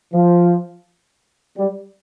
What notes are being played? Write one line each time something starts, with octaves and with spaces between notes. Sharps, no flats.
F3
G3